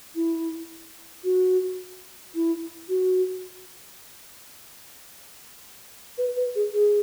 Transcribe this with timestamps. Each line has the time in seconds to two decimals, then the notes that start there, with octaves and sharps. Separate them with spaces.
0.15 E4
1.24 F#4
2.35 E4
2.89 F#4
6.18 B4
6.37 B4
6.55 G#4
6.73 G#4